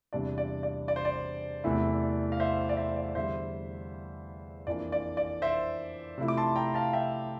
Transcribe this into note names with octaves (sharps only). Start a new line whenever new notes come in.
E2 C3 G3 D4 D5
D5
D5
D5
C5
D5
E2 C3 E3 A3 E4
F5
C5 E5
D5
C5 E5
D5
E2 D3 G3 C5 E5
F2 E3 A#3 D4 D5
D5
D5
C5 E5
C3 F3 A3 E4
D6
A5 C6
G5 A#5
F5 A5
E5 G5